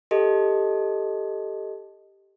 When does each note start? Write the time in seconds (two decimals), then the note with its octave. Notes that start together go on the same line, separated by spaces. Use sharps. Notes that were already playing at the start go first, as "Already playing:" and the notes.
0.11 G4 A4 D#5